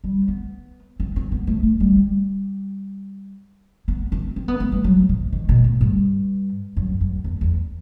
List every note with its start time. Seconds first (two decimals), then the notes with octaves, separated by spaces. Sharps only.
0.04 G3
0.28 B3
1.00 C4
1.16 C4
1.32 B3
1.47 A3
1.63 A3
1.80 G3
1.96 G3
3.88 B3
4.12 C4
4.36 C4
4.48 B3
4.60 A3
4.72 G3
4.84 F#3
5.09 C3
5.33 D#3
5.49 B2
5.64 A2
5.81 G2
6.77 F#2
7.01 F#2
7.24 E2
7.41 E2